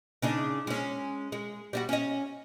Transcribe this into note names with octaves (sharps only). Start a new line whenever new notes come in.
C#3 D4 D#4
G#3 C#4
G#3
G3 D#4 F#4
C#4 D#5